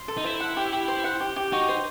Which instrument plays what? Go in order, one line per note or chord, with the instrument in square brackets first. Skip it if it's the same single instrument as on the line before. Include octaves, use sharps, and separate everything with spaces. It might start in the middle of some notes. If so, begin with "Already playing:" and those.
Already playing: [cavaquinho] C6
A4
[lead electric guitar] D#4
[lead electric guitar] E4 [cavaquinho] C5
[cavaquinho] F#5
G4
G4
C5
F#5
G4
G4
[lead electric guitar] D#4 [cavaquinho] F#4
[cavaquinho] C5